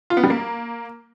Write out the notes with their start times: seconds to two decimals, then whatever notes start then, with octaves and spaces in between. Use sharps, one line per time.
0.10 F4
0.17 B3
0.23 G3
0.30 A#3